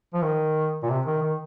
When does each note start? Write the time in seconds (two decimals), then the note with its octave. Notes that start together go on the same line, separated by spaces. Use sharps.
0.14 F3
0.22 D#3
0.83 A#2
0.89 C3
1.06 D#3
1.22 D#3